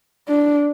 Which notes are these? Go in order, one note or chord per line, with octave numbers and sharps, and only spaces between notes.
D4